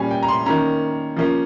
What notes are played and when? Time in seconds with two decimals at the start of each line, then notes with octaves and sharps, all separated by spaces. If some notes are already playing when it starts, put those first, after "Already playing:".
Already playing: A#2 G3 C#4 G#5
0.11 G5
0.23 A#5
0.28 C6
0.46 D#3 A#3 C#4 A#5
1.16 F3 A#3 C#4